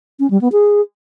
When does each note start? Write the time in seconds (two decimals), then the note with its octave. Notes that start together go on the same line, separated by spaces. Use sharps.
0.19 C#4
0.30 G3
0.41 B3
0.52 G#4